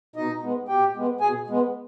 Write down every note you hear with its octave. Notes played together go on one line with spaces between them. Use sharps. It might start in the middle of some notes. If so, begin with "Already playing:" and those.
B2 D#4 D#5
G#3 B3
B2 G4 G5
G#3 B3
B2 G#4 G#5
G#3 B3